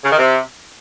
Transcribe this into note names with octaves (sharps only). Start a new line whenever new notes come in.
C#3
D#3
C3